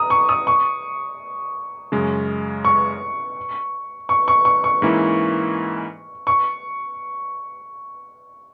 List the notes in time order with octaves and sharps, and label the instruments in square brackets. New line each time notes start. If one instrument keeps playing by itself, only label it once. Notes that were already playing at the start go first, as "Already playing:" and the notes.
Already playing: [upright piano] A#5 D#6
C#6
D#6
C#6
[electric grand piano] F#2 C#3 G#3
[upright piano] C#6
C#6
C#6
C#6
C#6
[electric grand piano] G#2 E3 A#3 C#4 E4
[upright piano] C#6